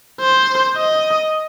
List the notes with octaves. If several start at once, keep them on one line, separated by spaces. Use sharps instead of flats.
C5
D#5